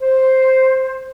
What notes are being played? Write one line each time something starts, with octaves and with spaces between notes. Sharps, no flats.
C5